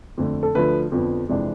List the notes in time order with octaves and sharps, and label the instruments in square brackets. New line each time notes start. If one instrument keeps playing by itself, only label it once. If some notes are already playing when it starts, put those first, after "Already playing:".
[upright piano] F2 D3 A3
A4
D2 D3 F3 B4
F2 D3 F3 B3
F2 C3 E3 G#3 D4